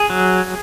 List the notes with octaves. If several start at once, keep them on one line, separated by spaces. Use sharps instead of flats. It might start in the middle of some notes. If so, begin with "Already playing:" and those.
Already playing: G#4
F#3